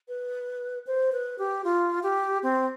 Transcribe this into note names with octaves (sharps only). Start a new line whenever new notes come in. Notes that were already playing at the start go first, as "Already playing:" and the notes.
B4
C5
B4
G4
F4
G4
C4